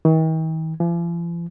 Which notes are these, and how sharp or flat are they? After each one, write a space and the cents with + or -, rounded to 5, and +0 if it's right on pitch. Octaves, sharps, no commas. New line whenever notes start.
D#3 +45
F3 -45